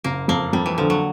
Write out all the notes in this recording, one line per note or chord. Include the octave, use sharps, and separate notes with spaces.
F#1 A#3
F2 A#3
F2 G3
E3
D3 F3
F#3